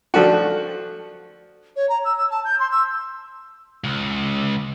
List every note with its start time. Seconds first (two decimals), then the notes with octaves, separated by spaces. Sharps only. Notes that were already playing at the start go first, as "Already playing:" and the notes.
0.14 F3 A3 D4 F#4
1.76 C#5
1.89 A#5
2.04 E6
2.17 E6
2.30 A5
2.44 G6
2.59 C6
2.71 E6
3.84 C#2